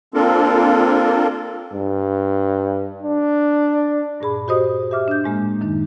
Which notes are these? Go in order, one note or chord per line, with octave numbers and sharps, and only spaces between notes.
A#3 C4 D4 F4 A4 A#4
G2
D4
G2 A#2 G#4 B5
F#4 G4 C5 D#5 D#6
G4 E5 D6 F6
D4 G6
A2 G#3 A#3
F#2 D#3 D#4